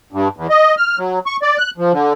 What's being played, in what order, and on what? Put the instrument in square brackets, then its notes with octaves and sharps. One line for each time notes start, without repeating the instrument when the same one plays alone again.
[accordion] G2
E2
D#5
F6
F#3
C#6
D5
F#6
F3
D3